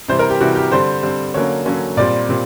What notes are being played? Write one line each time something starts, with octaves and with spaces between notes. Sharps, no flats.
C3 E3 G3 C5
A#4
G4
C3 E3 G3 F#4
G4
D3 G3 C4 C5
D3 G3 C4
D3 F#3 A#3 C#4 C#5
D3 F#3 A#3 C#4
A#2 G3 C4 D5
A#2 G3 C4